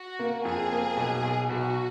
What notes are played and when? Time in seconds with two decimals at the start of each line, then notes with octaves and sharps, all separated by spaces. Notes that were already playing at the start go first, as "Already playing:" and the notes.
Already playing: F#4
0.19 A#3
0.45 F2 G#4
0.71 A#3
0.97 B1
1.23 B1
1.49 B1 F#4